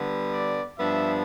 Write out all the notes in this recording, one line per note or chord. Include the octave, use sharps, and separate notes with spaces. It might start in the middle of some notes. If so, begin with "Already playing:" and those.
Already playing: D3 G3 B3
D5
G2 F3 B3 D4 E5